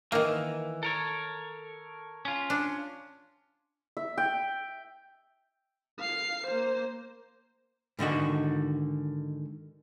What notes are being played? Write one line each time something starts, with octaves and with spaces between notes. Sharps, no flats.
D#3 E3 A#3
A4 A#4 C#5
C#4 F4
D4
E5
G5
F5 C7
A#3 C5
G#2 D3 D#3 F#4